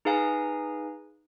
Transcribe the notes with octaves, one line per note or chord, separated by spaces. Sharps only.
D#4 G#4 B4 F5 G#5 A#5